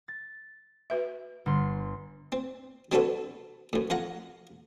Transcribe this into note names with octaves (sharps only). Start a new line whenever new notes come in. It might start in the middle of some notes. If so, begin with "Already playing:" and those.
A6
F#4 B4 E5
G1 C6
C4
F#3 C4 D4 F#4 A4 B4
F#2 A2
F2 F5 F#5 A#5